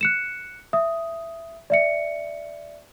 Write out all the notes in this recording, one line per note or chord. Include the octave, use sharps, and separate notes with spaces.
F#6 C#7 E7
E5 D#6
D5 E5 C#7